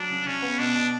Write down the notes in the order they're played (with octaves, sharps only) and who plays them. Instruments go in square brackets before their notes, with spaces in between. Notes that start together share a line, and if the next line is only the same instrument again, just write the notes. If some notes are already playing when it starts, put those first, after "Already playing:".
Already playing: [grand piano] F#3 [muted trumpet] D4
[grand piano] C#3
[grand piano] C#3 [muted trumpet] C#4
[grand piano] B3
[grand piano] B2 [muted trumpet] D4
[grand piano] B2